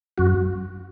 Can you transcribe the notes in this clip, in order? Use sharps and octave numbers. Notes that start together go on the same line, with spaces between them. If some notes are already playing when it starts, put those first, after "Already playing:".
F#2 F#4